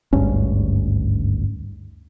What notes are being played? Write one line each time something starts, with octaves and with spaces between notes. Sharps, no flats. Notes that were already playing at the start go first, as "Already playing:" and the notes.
G#1 D2 G2 C#4